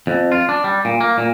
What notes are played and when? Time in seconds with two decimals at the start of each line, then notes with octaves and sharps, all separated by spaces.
0.07 F2
0.32 F4
0.49 D4
0.64 G3
0.85 A#2
1.01 A#3
1.18 A#2